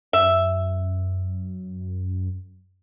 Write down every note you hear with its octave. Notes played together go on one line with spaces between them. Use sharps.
F#2 E5